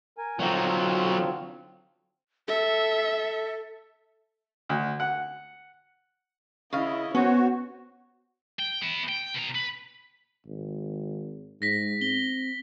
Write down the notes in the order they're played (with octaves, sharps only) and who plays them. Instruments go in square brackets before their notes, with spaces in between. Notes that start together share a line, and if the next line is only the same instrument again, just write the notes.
[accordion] A#4 G#5
[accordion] D3 C4 F4 [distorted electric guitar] F#3 D#4
[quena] A4 [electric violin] E5
[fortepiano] D2
F#5
[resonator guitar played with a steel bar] C#3 F5 [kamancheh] E4 D#5
[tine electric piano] B3 [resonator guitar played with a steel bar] C#4 [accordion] F#4 [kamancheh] C5 C#5
[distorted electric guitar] G5
B3 E4
G5
B2 A#5
B4
[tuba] G#1
[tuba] G#2 [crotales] A#6 B6
[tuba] C4 [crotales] G7